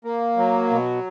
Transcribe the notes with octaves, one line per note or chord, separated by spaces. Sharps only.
A#3
F#3
B2